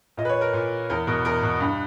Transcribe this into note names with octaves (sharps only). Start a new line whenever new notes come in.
A#2 D#5
B4
C#5
A#4
A#2
E2 A#4
B2 A#4
E2 A#4
B2
G2